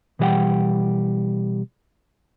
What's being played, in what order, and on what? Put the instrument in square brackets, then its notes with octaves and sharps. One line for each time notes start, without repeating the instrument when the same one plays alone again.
[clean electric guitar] B2 E3 G3 D5 F#5 G5